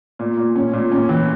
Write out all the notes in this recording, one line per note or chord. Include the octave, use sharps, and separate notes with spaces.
A#2
A#2
C#4
A#2
C#4
E3